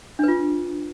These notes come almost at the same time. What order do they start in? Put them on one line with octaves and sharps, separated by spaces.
D4 B4 F4